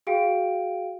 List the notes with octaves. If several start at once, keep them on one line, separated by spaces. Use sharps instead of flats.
F#4 G#4 F5 G5 D7